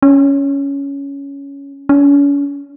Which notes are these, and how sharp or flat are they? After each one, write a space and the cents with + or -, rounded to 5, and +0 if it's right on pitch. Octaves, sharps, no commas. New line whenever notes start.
C#4 +10
C#4 +40